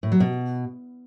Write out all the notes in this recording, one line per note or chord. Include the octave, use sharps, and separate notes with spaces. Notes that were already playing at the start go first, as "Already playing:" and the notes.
A2
F#3
B2